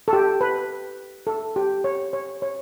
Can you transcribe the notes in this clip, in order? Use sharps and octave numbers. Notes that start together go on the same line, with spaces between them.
A4
G4
B4
A4
G4
C#5
C#5
C#5